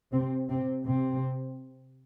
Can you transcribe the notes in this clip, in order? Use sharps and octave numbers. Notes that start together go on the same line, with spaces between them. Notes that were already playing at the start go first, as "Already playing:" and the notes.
C3 C4
C3 C4
C3 C4